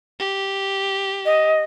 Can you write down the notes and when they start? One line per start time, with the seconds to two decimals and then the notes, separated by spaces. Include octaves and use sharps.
0.19 G4
1.25 D#5